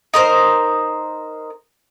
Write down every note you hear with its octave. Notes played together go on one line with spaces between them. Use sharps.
D#4 A#4 C5